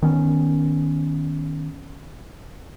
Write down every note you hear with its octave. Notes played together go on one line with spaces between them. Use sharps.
D#3 B3 C#4